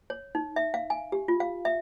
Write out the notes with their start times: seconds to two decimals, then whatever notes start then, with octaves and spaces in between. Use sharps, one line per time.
0.10 C#5
0.35 D#4
0.56 E5
0.74 F5
0.90 G#5
1.12 G4
1.28 F4
1.40 F5
1.65 E5